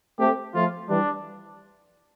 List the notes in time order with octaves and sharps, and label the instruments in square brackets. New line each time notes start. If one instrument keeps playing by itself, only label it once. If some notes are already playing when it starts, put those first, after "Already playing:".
[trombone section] A3 C4 [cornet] G4
[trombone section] F3 A3 [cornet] F4
[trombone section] E3 G3 [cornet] D4